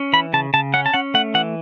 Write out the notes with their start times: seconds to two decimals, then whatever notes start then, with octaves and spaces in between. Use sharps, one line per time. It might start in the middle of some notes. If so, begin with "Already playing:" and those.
Already playing: C#4
0.13 E3 B5
0.33 C#3 A5
0.54 C#3 A5
0.74 C#4 F#5
0.86 A5
0.94 C#4 F#5
1.14 A3 F#5
1.34 E3 F#5